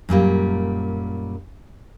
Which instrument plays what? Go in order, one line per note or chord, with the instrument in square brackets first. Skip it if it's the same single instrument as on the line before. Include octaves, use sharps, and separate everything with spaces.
[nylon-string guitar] F#2 A#2 G3 A#3